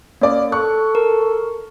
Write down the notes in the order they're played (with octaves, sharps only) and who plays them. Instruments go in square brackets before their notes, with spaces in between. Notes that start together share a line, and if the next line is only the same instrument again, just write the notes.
[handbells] A#3 [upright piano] C#4 D5
[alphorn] A4 [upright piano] C#6 [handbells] F#6
[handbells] A#4